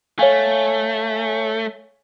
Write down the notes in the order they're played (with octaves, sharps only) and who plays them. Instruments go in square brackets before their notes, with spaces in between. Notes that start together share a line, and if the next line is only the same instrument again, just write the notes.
[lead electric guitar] A3 [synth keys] C#5 F5 G#5